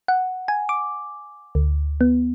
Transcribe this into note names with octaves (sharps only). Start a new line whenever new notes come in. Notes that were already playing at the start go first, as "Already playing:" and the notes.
F#5
G#5
D6
D2
B3